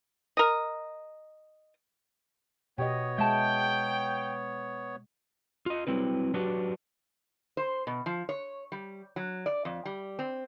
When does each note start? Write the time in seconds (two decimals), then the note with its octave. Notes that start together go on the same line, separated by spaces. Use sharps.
0.37 A#4 D#5
2.78 B2 B3 G4 C#5 D#5
3.18 G#3 E5 G5 A5
5.66 F4 D#5
5.87 F#3 G3 C4 E4 B4
6.34 F#3 D4 F#4 G4 B4
7.57 C5
7.87 B2
8.06 F3
8.29 C#5
8.72 G3
9.16 F#3
9.46 D5
9.65 F2
9.85 G3
10.19 C4